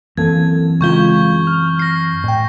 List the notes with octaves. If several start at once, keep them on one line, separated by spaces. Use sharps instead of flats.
F#2 E3 A#3 C4 A4 G#6
C#3 G#3 F4 C#6 G6 G7
F6
A#6 C7
A2 G5